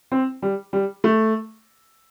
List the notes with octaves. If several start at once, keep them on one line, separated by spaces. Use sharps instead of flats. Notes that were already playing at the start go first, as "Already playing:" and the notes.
C4
G3
G3
A3